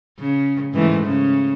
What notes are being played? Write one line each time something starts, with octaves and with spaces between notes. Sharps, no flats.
C#3
G#2 E3 A3
C#3